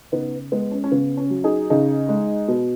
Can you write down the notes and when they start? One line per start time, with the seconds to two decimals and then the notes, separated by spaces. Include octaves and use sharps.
0.12 C#3 B3 D#4
0.52 G#3 B3
0.71 C#4
0.84 C#4
0.92 C#3 B3
1.17 C#4
1.30 F#3
1.44 D#4 G#4
1.70 C#3 D#4 G#4
2.09 G#3
2.48 B2